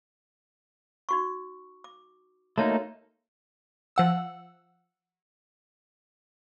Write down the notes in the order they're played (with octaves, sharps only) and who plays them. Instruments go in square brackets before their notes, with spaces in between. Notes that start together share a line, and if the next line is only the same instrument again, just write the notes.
[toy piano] D#4 F#4 C#6
D6
[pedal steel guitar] A3 A#3 D#4 [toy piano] F#4 C#5 A5
[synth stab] F3 F#5 E6